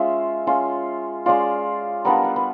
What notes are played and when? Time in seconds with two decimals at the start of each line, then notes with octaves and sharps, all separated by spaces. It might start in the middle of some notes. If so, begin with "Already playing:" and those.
Already playing: G#3 C#4 F4 E5
0.47 G#3 C#4 F4
1.26 G#3 C#4 F4 D5
2.05 G3 B3 D4 F4 A#4
2.24 B4
2.36 B4